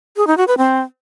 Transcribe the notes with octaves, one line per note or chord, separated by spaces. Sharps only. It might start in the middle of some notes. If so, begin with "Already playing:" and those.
G#4
D#4
F#4
B4
C4